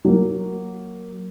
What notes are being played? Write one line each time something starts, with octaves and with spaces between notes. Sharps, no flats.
F#3 A#3